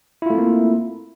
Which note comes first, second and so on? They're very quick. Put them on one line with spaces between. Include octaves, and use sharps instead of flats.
E4 F4 A3 C4 A#3